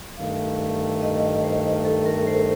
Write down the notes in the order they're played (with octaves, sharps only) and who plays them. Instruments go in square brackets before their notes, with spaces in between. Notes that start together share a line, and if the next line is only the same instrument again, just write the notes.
[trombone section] G2 D#3 A3 [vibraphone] F5
[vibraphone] D#5
C5
A4
A#4
C5